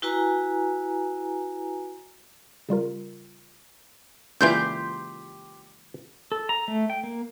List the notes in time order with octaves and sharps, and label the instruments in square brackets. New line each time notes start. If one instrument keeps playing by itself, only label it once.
[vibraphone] E4 F#4 B4 G#5 A#5
[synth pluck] C#3 G3 F4 A#4
[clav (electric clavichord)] C#2 A#2 E3 [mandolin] G4 C6 G6
[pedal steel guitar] A4
A#5
A3
G5
A#3